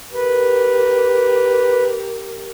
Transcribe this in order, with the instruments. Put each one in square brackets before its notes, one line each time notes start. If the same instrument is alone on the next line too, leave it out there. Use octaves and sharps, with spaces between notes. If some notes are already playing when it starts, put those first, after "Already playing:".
[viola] G4 A#4 [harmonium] B4